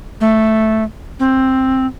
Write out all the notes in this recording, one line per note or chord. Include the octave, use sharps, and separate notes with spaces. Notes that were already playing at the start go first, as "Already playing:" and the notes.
A3
C4